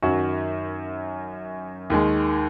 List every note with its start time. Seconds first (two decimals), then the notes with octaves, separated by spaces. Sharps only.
0.02 F#2 D#3 F#3 C#4 F#4
1.90 D#2 D#3 G#3